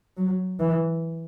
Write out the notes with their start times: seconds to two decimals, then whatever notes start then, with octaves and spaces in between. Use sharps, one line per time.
0.17 F#3
0.60 E3